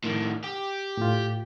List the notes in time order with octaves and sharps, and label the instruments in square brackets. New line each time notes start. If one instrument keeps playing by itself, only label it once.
[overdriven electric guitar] A2 D#3
G4
[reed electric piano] A2 F4